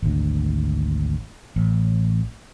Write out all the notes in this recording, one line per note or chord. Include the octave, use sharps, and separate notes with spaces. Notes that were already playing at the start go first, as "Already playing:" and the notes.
G#1 D2
A1